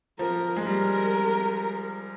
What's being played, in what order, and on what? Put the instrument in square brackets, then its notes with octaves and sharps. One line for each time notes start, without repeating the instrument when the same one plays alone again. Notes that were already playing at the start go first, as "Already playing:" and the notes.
[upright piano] F3 [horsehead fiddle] A#4
[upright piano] G#3
[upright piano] G3 [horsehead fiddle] A#4